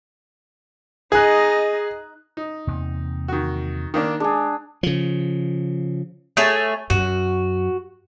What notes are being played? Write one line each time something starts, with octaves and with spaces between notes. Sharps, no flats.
D#4 G#4 D#5 F#6
D#4
E2 C3 A#3
D#3 F#4
D#3 A#3 D4
G#3 D4 G#4
C#3 F3
A3 G#4 C#5
F#2 F#4